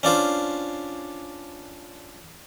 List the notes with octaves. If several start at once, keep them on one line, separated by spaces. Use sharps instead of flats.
C#4 D4 F4 C5